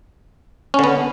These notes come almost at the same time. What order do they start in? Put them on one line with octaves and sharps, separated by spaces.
C#4 D3 B3